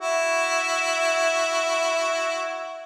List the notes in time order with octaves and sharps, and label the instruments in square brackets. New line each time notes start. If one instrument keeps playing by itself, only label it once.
[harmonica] E4 F#4